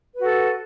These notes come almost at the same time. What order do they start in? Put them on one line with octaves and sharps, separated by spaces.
B4 F#4 A4